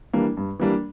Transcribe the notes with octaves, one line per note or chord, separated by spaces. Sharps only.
E3 G3 A#3 D4
G2
E3 G3 A#3 D4